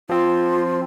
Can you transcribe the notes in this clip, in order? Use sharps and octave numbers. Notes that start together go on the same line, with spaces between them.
F3 C4 F4